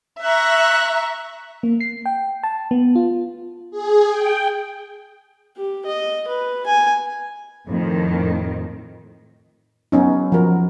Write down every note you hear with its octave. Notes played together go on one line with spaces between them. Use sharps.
E5 A#5 C#6 F#6
A#3
C7
G5
A5
B3
F4
G#4
G5
G4
D#5
B4
G#5
F2 A2 D#3
F#3 B3 C#4 D#4
F3 F#4 A#4